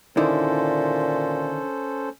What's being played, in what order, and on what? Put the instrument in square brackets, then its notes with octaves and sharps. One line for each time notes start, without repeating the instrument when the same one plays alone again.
[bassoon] A#2 [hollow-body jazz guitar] D3 D#3 E4 [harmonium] C#4 A4 C5